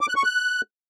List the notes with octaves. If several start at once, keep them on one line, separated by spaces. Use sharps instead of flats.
D6
F#6
C#6
F#6